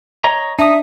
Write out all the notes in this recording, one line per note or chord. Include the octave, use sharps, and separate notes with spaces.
C#5 D#5 A#5
D4 D#4 E5 D#6